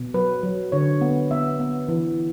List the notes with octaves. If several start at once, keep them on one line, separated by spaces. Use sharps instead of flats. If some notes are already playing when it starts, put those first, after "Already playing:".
Already playing: B2
F#3 B4
F#3
D3 C#5
B3
B3 E5
B3
E3